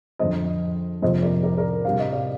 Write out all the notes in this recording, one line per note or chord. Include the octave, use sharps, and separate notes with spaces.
F2 D3 F3 C5 D#5
F2 C3 F3 A#3 D4 C5 D#5
A#4 D5
A#4 D5
A#4 D5
C3 G3 D4 F5
D#5
D5